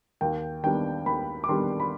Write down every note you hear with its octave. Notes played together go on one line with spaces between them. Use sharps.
D#2 G5
D#3 G3 B3 D4 G5
D#2 B5
D6
D#3 G3 B3 D4 C6
B5